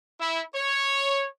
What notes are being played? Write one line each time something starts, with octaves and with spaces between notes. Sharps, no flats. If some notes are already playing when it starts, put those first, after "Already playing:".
E4
C#5